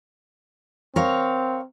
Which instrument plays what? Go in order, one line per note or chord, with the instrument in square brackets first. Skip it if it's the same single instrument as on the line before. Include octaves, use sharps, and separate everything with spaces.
[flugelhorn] C4 [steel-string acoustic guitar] A#4 C#5 F5